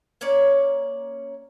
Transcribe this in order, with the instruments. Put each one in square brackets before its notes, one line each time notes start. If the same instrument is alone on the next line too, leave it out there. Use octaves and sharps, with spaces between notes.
[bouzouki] A#3 C#4 C#5 D5